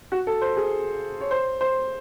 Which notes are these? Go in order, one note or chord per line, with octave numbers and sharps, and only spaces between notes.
F#4
A4
C5
G#4
C#5
C5
C5